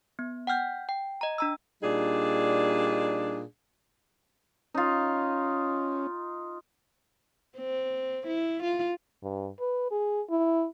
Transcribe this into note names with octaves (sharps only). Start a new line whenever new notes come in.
B3
F#5 G5 F6 G6
G5
D#5 A#5
D4 A#5 E6
A#2 G3 D4 D#4 G#4
C#4 D#4 F4
C4
E4
F4
G2
B4
G#4
E4